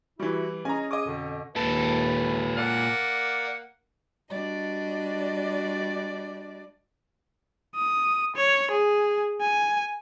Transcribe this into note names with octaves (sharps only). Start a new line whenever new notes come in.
E3 G3 E4 F#4
C#4 G#4 D#5 G#5 A#5
G#4 D#5 D6 D#6
F2 B2 D3
D#2 A#2 A4 B4
A#3 D5 F#5
G3 D4 F#4 D5 D#5
D#6
C#5
G#4
G#5